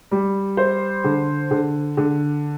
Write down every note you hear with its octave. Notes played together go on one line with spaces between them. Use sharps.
G3
C5
D3
D3
D3